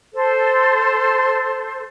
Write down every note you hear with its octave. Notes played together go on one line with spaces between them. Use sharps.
A4 C5